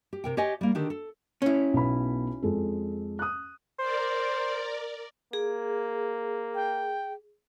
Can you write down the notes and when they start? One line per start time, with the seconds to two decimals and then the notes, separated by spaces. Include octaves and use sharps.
0.13 G4
0.24 C3 A#4 G5
0.37 G4 C#5 D#5 G#5
0.61 G3 A#3
0.75 D3 D#3 G4
0.90 A4
1.42 C#4 E4
1.74 B1 B3 B5
2.43 F2 G#3 A4
3.19 D#6 F#6
3.79 A#4 C5 D5
5.33 A#3 G#4
6.55 G5